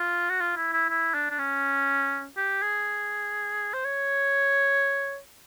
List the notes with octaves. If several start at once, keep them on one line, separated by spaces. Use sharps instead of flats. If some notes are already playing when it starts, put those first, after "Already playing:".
Already playing: F4
F#4
F4
E4
E4
E4
D4
D4
C#4
G4
G#4
C5
C#5